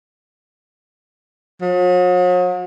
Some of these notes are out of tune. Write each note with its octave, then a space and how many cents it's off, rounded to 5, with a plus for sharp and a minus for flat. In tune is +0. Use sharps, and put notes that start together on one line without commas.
F#3 -45